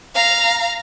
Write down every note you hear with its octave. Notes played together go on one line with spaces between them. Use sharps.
F5 A#5